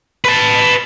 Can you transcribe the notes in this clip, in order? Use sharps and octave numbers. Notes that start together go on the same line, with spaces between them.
B4 A5